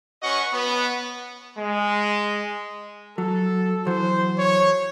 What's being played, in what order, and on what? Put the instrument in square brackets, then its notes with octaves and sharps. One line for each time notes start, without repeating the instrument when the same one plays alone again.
[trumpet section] C#4 F#4 B4 D#5 F#5 C#6
B3
[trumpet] G#3
[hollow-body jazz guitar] F#3 [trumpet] A4
[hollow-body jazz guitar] E3 F#3 [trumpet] C5
[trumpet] C#5